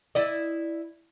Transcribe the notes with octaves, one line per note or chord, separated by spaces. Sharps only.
E4 D5 D#5